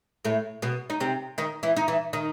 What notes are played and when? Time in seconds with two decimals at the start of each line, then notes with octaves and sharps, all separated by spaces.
0.25 A2 A3
0.62 B2 B3
0.90 D#4
1.00 C3 C4
1.38 D#3 D#4
1.63 E3 E4
1.76 D#4
1.88 E3 E4
2.13 D#3 D#4